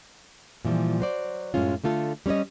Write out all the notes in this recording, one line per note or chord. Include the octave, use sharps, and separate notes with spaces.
A#2 E3 F3 G3
F#3 C5 D5
F#2 A2 G#3 C#4 F4
D3 A3 F4 A4
G3 C#4 A4 C#5 D#5